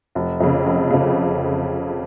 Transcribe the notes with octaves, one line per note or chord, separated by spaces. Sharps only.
F1
F2 C#3
F1
F2 C#3